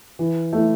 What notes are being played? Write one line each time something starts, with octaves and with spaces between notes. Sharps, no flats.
E3
A3 E4